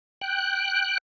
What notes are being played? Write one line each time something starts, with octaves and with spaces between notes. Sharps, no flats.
G5 F#6